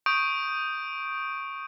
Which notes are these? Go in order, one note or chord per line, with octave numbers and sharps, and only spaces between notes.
C#6 D#6 G6 D7